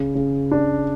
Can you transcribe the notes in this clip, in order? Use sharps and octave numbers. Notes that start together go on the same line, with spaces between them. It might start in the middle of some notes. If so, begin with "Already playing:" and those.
Already playing: C#3
C#3
D4